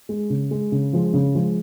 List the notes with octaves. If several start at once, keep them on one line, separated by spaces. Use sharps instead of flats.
G#3
C#3
G#3
C#3
F3 G#3
C#3
F3 G#3